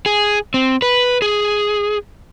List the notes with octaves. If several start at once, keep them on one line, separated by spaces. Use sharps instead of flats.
G#4
C4
B4
G#4